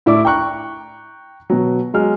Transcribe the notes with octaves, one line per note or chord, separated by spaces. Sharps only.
A2 E4 D5 D6
G5 A#5 C#6 F#6
B2 F#3
F#3 G#3 F6